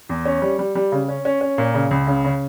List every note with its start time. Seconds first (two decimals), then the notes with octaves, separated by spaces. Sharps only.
0.09 E2
0.25 C#4
0.42 G3
0.59 G3
0.75 G3
0.92 C#3
1.08 C#4
1.25 C#4
1.41 C#4
1.58 A#2
1.74 C#3
1.91 C#2
2.07 C#3
2.24 C#3